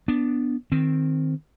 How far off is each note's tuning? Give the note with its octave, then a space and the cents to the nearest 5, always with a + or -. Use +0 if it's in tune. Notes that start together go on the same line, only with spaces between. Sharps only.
B3 +0 D4 +0
D#3 +0 C4 +0